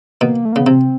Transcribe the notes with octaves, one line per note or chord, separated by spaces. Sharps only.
B2 A#3
A3
A#3
C#3 B3
C3 C4